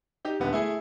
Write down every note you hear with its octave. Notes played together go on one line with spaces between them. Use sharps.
D#4 G4
D#1 D3 B3
A3 E4 G#4